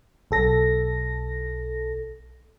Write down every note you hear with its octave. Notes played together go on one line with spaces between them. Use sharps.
B1 A4 A#6